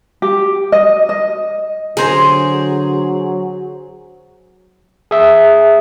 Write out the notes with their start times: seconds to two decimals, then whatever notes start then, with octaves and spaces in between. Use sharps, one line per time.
0.22 G4
0.72 D#5
1.09 D#5
1.97 D3 F#3 G#4 A#4 C5 A#5
5.11 G#4 E5